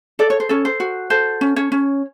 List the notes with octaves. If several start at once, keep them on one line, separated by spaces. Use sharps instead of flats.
A4 D5
C#5
C5
C#4 A4 C#5
C5
F#4
A4 C5
C#4
C#4 C#5
C#4